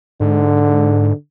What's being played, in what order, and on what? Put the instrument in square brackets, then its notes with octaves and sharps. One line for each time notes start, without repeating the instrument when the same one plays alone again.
[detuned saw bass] G#2 [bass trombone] D3